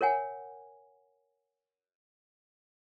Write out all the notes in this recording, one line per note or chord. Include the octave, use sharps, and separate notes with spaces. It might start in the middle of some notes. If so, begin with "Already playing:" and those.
A#4 C#5 F#5 G#5